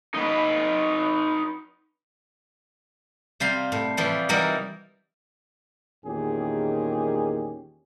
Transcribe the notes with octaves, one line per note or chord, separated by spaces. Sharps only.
D#4 B4
C3 G3 F5 C6
A2
E3 F3 G3
E3 G3 D#4 A#4 F#5
E2 A#2 D#3 C#4 G4 G#4